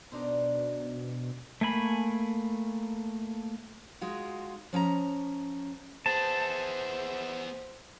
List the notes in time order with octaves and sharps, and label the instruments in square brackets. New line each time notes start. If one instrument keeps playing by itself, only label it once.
[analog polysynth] B2 [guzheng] D4 D#4 C5
[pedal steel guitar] A3 A#3 G#5 B5
[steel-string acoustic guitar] G#3 D#4 F4 F#4
F3 C#4 G5 A#5
[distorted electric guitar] B3 G#4 [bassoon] C5 [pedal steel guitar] A5